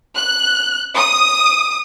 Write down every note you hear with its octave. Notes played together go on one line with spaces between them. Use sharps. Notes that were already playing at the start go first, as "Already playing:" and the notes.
F#6
D#6